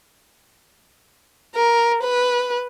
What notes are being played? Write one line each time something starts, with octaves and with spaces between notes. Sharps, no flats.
A#4
B4